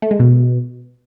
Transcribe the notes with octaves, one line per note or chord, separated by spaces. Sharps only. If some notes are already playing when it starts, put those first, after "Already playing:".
A3
G#3
B2